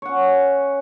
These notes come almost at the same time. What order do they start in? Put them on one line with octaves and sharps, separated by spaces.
C#5 F#5 C#4